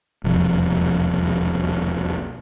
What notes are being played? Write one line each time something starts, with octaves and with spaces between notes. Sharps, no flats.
E1 C2 F2